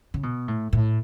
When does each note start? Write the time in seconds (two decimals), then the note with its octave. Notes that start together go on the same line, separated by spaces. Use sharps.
0.14 C#3
0.23 B2
0.48 A2
0.73 A2